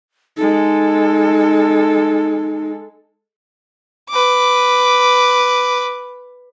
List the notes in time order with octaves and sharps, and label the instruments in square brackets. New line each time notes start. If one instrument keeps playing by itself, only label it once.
[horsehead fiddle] G#3 A4 [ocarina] D#4
[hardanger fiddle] B4 D6